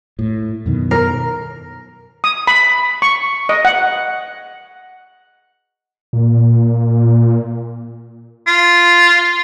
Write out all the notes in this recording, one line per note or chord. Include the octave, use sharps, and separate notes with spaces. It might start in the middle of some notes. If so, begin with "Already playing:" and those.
A2
F#2 B2 D#3
A#4
D#6
B5
C#6
D#5
F#5
A#2
F4